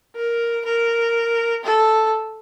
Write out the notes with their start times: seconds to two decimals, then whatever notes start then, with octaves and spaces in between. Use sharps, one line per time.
0.16 A#4
0.65 A#4
1.64 A4